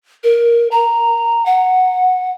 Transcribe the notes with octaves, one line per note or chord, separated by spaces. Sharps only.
A#4
A#5
F#5